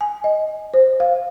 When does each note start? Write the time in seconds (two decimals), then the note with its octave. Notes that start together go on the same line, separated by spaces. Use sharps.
0.01 G#5
0.24 D#5
0.74 C5
1.00 F5